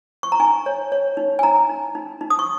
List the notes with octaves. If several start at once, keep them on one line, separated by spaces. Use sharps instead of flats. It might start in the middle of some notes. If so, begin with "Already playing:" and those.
C#6
A#5
D#4 G#5
C#5
C#5
D#4
G#5
D#4 A#5
D#4
D#4
D#4
D#6
C#6